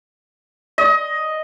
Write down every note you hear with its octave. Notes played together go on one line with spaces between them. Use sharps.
D#5